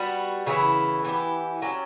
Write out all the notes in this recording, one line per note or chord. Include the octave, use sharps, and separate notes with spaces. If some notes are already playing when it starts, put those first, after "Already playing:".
Already playing: G3 B3 F#4
C#3 E3 B3 E4
E3 B3 E4 G4
F#3 C#4 G4 D5